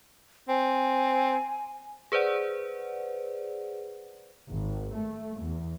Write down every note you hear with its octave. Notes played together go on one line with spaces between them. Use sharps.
C4 G#5
G#4 B4 C5 D5 F#5
G#1
A3
E2